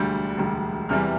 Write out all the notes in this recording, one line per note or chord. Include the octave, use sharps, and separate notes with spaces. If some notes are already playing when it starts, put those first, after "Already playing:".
Already playing: E1 D2 D3 G3 G6
E1 D2 D3 G3
E2 C3 E3 G3 F6